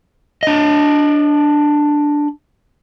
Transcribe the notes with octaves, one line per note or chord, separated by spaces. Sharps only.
D4 D#5